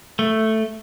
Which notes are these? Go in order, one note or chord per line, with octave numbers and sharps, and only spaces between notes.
A3